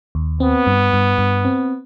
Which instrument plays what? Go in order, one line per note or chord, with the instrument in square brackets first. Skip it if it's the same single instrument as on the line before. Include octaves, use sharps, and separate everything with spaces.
[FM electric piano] D#2
[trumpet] B3 [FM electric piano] C4
[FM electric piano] G2
G2
G2
C4